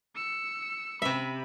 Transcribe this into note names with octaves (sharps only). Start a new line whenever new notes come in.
E6 C#7
C3 E5 B5